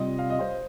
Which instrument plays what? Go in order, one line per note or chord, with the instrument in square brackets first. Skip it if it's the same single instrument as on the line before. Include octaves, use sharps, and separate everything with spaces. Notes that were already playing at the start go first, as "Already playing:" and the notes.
Already playing: [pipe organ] C3 G3 C4 F4 [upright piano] D#5
[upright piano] F5
D#5
C5